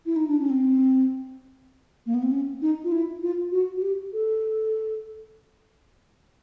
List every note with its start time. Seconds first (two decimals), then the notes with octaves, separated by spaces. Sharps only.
0.06 E4
0.16 D#4
0.28 D4
0.39 C#4
0.50 C4
2.06 A#3
2.14 B3
2.23 C4
2.31 C#4
2.62 D#4
2.84 F4
2.92 E4
3.22 F4
3.52 F#4
3.77 F#4
3.82 G4
4.13 A4